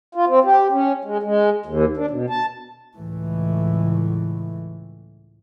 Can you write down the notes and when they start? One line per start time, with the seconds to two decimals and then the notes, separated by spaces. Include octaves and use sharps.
0.15 F4
0.27 C4
0.44 G4
0.72 C#4
1.04 G#3
1.23 G#3
1.66 D#2
1.97 D4
2.10 B2
2.30 A5
2.96 C#2 A2 E3